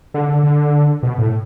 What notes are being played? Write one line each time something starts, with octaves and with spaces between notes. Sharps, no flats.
D3
D3
D3
B2
A2